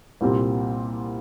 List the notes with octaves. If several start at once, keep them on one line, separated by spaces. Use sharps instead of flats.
C2 A#2 G3 C4